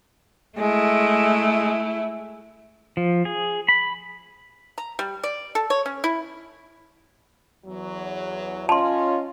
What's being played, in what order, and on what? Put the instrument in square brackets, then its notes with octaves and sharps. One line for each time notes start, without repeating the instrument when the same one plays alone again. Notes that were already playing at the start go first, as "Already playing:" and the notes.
[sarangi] G#3 [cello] A3 E4
[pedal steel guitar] F3
G#4
B5
[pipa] A#5
G3
D5
A4
C#5
C#4
E4
[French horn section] E2 F#3
[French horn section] C#4 D#5 [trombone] F4 [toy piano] A5 C6